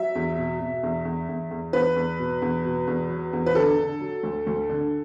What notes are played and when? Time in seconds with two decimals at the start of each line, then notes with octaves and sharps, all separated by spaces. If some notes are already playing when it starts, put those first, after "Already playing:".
Already playing: F#3 E5
0.15 E2
0.38 B2
0.60 B2
0.83 E2
1.05 E2
1.29 E2
1.51 E2
1.73 E2 B4
1.96 E2
2.19 B2
2.42 E2
2.65 B2
2.87 E2
3.09 F#3
3.33 E2
3.46 B4
3.55 D3 A4
3.77 D3
4.00 F#3
4.23 D2
4.47 D2
4.69 D3